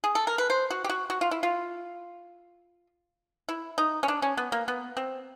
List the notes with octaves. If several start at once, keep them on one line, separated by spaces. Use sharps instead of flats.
G#4
A4
A#4
B4
C5
F#4
G4
F#4
F#4
F4
E4
F4
E4
D#4
C#4
D4
C#4
B3
A#3
B3
C4